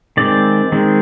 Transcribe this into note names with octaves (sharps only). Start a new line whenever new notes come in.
D#3 G#3 C4 D5
D#3 G#3 C4